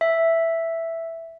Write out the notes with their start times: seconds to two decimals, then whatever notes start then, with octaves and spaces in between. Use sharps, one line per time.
0.01 E5